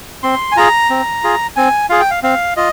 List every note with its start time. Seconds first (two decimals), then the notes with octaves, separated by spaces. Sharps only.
0.23 C4 C6
0.52 G#5
0.56 F4 G#4 A#5
0.90 C4
1.24 F4 G#4
1.56 C4 G#5
1.90 F4 G#4 F5
2.00 G5
2.11 F5
2.23 C4 F5
2.57 F4 D#5